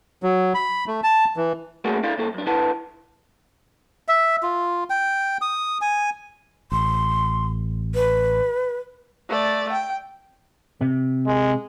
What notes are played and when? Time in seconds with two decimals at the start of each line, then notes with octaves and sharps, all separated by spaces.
0.23 F#3
0.54 B5
0.87 A3
1.03 A5
1.37 E3
1.85 A3 A#3 C#4 F#4 G#4 A#4
2.03 D4 E4 A4 D5 F5
2.18 C2 A#3 A4
2.34 F#2 D4
2.47 D3 E4 B4 F#5 A5
4.08 E5
4.43 F4
4.90 G5
5.42 D#6
5.81 G#5
6.72 A1 C6
7.95 B4
9.29 A3 D5
9.72 G5
10.81 C3
11.26 G#3